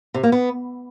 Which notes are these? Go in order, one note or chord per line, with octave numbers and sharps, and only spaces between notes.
C3
A#3
B3